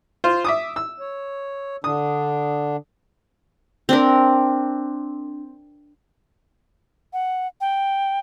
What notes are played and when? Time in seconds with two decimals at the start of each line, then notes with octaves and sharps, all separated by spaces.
0.24 F4 C5
0.45 E5 D6 D#6
0.76 E6
1.00 C#5
1.84 D3 D4 D#6
3.89 C4 D4 A#4
7.13 F#5
7.61 G5